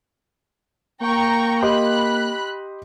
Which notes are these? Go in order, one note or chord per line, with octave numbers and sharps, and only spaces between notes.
A#3 G5 A#5 C#6
G4 D#5 B5 C6 F#6